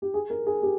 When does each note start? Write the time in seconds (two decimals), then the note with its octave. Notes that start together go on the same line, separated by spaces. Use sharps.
0.02 G4
0.14 G#4
0.30 A#4
0.46 G#4
0.63 G4